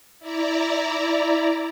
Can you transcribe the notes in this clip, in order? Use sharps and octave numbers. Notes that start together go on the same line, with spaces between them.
E4 D5 A#5